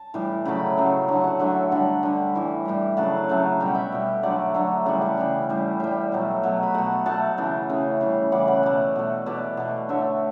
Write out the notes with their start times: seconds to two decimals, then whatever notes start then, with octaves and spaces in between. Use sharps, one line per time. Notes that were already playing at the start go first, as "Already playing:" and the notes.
Already playing: A5
0.14 A2 E3 G3
0.45 C#3 F#3 A3 G5 B5
0.77 C#3 F#3 A3
1.08 D3 F#3 A3 F#5 A5
1.24 F#5 A5
1.39 D3 F#3 A3 E5 G5
1.72 D3 G3 F#5 A5
2.03 D3 G3
2.35 A2 E3 G3
2.65 A2 E3 G3
2.97 C#3 F#3 A3 F#5 A5
3.29 C#3 F#3 A3
3.60 B2 G3 G5
3.67 F#5
3.75 E5 G5
3.92 B2 G3
4.23 D3 F#3 A3 D5 F#5
4.54 D3 F#3 A3
4.85 C#3 E3 G3 D5 F#5
5.01 F#5 A5
5.17 C#3 E3 G3
5.49 A2 G3
5.80 A2 G3 E5 G5
6.12 B2 F#3 A3
6.43 B2 F#3 A3
6.63 B5
6.74 B2 A3 F#5 A5
7.06 B2 A3 F#5 A5
7.38 C#3 E3 A3
7.69 C#3 E3 A3
8.01 C#3 E3 G3
8.32 C#3 E3 G3 D5 F#5
8.48 D5 F#5
8.63 B2 A3
8.96 B2 A3
9.26 B2 A3 B4 D5
9.57 B2 A3
9.89 D3 A3 C#5 E5